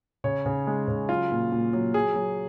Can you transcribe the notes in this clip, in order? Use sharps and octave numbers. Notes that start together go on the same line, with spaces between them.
C#3 C#5
C#3
G#3
C#3
F#3 F4
A#2
A#2
F#3
F#3 G#4
F#3